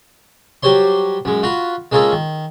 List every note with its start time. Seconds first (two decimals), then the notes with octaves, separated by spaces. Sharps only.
0.63 F#3 G3 G4 C5 C#5 C6
1.25 F#2 G#3
1.43 F4 F#4 F5 B5
1.92 G#3 A#3 C#4 F4 G#4 A4
2.13 D#3